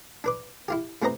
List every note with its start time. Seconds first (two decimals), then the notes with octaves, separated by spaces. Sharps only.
0.24 D4 B4 D6
0.68 E4 F4 G4
1.02 A2 C3 C4 B4 D#5 A#5